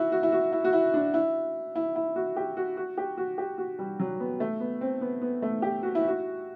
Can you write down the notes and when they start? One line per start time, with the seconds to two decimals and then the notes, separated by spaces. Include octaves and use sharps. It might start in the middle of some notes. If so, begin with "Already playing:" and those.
Already playing: E4 F#4
0.12 F#4
0.23 E4
0.32 F#4
0.53 E4
0.64 F#4
0.73 E4
0.94 D4
1.14 E4
1.76 E4
1.96 E4
2.16 F#4
2.36 G4
2.57 F#4
2.77 F#4
2.97 G4
3.17 F#4
3.38 G4
3.58 F#4
3.79 G3
3.99 F#3
4.20 B3
4.40 A3
4.60 B3
4.81 C4
5.01 B3
5.21 B3
5.42 A3
5.62 G4
5.83 F#4
5.95 E4
6.08 F#4